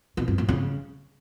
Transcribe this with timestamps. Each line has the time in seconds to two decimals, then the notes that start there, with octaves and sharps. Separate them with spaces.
0.17 B2
0.28 G2
0.38 A2
0.49 C#3